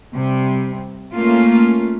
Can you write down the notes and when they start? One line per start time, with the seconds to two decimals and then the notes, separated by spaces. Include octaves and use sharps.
0.13 C3 G3
1.13 A3 A#3 C#4 F4